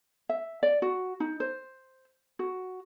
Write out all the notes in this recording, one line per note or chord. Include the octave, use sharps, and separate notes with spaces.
E5
D5
F#4
D#4
C5
F#4